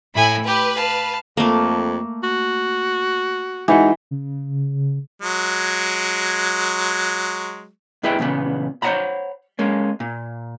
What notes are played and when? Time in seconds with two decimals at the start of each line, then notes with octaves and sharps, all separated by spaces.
0.15 A2 E4 G#5 B5
0.47 G4 B4
0.76 F5 A5
1.37 F2 A3 A#3
2.23 F#4
3.68 E3 G#3 D#4 F#4
4.11 C#3
5.22 F#3 G#3
8.03 G2 E4 G#4 B4 E5 G5
8.19 E2 A#2 C#3 B3
8.82 C5 C#5 D#5 F#5 A#5 B5
9.59 G#3 A#3 C#4
10.00 A#2